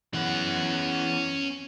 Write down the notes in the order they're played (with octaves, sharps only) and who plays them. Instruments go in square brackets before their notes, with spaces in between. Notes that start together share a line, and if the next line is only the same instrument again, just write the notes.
[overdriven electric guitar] E3 B3 [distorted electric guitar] C#4 F#5